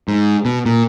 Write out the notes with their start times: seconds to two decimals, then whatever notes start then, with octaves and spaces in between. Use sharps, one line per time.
0.08 G#2
0.45 B2
0.66 A#2